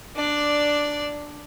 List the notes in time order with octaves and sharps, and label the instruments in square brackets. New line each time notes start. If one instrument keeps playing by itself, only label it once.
[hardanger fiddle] D4 D5